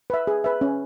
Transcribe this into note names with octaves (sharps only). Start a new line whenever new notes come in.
B4 E5
G#4
B4 E5
C#4